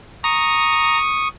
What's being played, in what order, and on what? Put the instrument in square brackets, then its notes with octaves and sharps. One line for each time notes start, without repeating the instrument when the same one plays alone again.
[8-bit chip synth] A#5 [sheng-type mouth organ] C#6 D#6